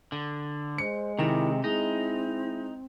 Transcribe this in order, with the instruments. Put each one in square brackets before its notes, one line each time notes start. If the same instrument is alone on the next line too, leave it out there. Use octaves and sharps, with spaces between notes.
[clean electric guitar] D3
[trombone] G#3 [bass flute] C5 [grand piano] C#7
[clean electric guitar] C3 [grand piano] D#3 E7 [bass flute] E4
[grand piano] G#3 [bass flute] C4 [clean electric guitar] D#4 [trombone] E4